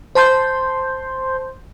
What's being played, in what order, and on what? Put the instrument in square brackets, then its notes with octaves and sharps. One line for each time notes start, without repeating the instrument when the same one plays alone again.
[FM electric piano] C5 A5 C6 G6